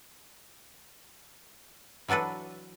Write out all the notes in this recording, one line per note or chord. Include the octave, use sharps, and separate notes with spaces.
E3 F#3 D4 A4 B4